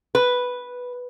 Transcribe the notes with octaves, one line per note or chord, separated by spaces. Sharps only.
B4